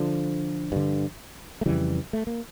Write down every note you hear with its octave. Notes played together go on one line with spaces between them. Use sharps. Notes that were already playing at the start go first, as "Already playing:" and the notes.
Already playing: D3 F3
G2 D3
A3
F2 C#3 E3 G3
A3
A#3